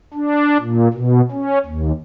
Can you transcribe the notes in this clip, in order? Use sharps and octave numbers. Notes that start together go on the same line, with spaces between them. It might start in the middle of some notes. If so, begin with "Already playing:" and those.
D4
A#2
B2
C#4
D#2